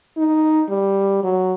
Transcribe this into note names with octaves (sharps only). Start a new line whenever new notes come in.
D#4
G3
F#3